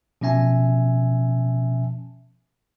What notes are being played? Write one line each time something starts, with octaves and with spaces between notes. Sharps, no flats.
B2 F3 C#4 E5 G#5 A5